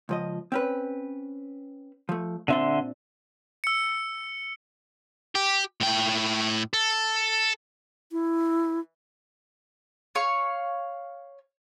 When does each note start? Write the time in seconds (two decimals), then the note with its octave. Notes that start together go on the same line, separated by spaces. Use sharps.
0.09 C#2 F3 D#5
0.52 C4 C#4 B4
2.09 F3 A3
2.48 A#2 D3 C4 D4 E5 C6
3.64 E6 C#7
5.35 G4
5.81 A2 G5
6.74 A4
8.12 E4
10.15 C#5 F5 C#6